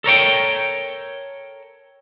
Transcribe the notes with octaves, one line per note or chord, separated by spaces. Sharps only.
A4 A#4 C#5 G5